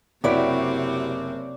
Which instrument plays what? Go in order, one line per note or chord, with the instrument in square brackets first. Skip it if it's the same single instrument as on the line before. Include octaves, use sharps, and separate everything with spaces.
[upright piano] F#1 [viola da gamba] C3 C4 [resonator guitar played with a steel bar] E4 F#4 G4 [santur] C#5 D5